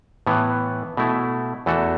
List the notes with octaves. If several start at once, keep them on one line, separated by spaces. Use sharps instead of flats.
A2 E3 B3
B2 A3 E4
E2 E3 A3 F#4 A4